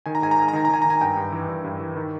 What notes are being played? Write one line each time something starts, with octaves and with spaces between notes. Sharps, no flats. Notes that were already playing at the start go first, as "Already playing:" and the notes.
D#3 G#5
A#5
G#2 G#5
A#5
G#2 G#5
A#5
D#3 G#5
A#5
D#3 G#5
D#3 A#5
G#5
G2 G5
G2
E3
G2
G2
E3
D#3